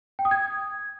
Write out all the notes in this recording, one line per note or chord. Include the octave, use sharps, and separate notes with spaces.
G5
D#6
G#6